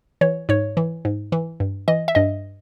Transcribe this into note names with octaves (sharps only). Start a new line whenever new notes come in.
E3 C#5
G#2 C#5
E3
G#2
E3
G2
E3 D#5
E5
G2 D#5